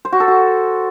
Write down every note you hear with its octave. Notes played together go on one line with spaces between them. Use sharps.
C5
F#4
A4
F#4